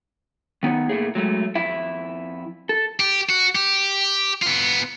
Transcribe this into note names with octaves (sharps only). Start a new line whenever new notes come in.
D#3 B3 D#4 C#5
A2 A3 A#3 G#4
F#3 G#3 A3
F2 E4 E5
A4
G4
F#4
G4
B3 F4